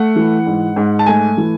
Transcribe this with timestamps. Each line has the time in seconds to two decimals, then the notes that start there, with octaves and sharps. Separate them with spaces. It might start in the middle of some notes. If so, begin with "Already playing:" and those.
Already playing: A3 F#5
0.16 E3
0.46 G#2
0.76 G#2
0.99 A5
1.06 A3 G#5
1.37 E3